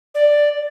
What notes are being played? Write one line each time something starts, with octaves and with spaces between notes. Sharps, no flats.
D5